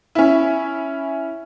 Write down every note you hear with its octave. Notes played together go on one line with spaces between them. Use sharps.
C#4 E4